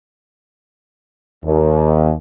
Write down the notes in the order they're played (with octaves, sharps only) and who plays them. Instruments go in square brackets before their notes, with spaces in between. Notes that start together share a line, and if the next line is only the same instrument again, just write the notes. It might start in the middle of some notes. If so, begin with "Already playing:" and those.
[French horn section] D#2